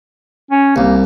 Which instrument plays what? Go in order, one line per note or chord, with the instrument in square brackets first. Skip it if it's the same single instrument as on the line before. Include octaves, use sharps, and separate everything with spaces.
[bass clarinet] C#4
[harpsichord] C2 [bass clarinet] A#3